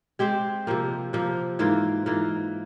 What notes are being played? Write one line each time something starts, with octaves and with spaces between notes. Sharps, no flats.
G#3 C4 G4 C5
C3 F3 A#3
C3 F3 A#3
G#2 E3 A#3 F4
G#2 E3 A#3 F4